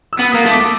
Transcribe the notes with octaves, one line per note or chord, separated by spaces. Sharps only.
E6
B3
A#3 D#6
A3
D6